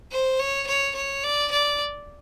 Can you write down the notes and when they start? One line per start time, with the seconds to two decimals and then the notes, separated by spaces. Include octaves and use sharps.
0.12 C5
0.40 C#5
0.67 C#5
0.95 C#5
1.24 D5
1.52 D5